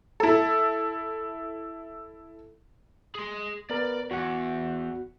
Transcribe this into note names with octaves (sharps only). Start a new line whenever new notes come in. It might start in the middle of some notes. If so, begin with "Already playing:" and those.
E4 A4
G#4 C6
B3 A#4 B4 D5
E2 F#4 F#5